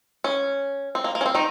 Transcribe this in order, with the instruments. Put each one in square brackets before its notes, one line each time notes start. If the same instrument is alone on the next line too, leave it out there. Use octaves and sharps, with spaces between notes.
[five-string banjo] C#4
C4
A#3
A#3
C#4
C4
D#3 D#4